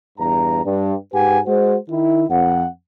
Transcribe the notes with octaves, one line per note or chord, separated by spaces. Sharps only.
E2 G2 A#5
G2
G#2 G4 B4 F#5 G#5
G#3 F#4 C5
D#3 E4
F2 F#5